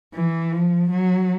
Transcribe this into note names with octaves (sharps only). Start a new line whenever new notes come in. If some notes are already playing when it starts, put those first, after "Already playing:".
E3
F3
F#3